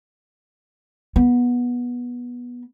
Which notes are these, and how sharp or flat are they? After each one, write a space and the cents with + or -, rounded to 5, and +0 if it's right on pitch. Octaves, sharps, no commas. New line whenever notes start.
B3 -15